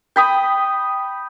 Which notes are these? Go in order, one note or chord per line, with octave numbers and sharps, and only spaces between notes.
G5 B5 D#6